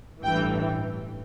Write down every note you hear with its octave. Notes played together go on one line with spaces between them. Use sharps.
A1 G2 E3 G5